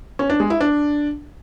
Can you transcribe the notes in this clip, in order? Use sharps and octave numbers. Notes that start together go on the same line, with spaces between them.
C#4
D4
G#3
E4
D4